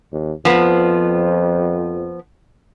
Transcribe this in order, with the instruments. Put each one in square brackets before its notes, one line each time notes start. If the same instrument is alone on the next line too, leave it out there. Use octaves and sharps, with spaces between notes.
[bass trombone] D#2
[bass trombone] F2 [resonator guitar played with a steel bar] F3 B3